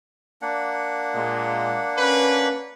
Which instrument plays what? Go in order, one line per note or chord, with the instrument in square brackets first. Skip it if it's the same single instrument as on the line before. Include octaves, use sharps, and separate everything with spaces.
[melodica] A#3 D4 F#5
[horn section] A#2 G#3
C#4 B4